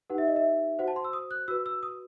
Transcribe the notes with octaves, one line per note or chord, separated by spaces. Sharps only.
D#4 G4 B4 F#5
E5
D#5
E5
F#4 C5 F#5
A5
C6
E6
D#6
F#6
F#4 B4 E6
E6
D#6